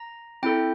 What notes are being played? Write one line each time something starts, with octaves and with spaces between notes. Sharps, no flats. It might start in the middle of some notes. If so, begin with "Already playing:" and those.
Already playing: A#5
C4 E4 A4 G5